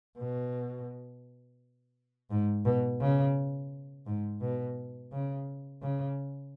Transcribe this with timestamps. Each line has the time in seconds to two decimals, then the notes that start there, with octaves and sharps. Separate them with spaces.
0.18 B2
2.31 G#2
2.65 B2
3.01 C#3
4.06 G#2
4.41 B2
5.12 C#3
5.82 C#3